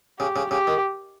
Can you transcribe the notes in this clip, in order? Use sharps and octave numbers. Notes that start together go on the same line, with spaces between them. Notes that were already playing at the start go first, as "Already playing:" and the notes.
C#3 G4
C#3
C#3 G4
D#3